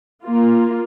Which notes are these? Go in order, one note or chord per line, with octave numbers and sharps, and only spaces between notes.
A#3 F4